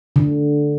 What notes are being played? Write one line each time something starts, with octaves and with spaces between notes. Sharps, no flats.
D3